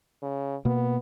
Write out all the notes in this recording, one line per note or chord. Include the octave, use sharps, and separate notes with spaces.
C#3
B2 A#3 B3